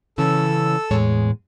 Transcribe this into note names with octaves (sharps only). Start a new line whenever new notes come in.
C#3 E3 C#4 A4 E6
E2 A2 G#3 C#5